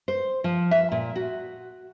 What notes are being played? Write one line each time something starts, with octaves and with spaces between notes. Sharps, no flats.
C5
F3
E5
A#2
F#4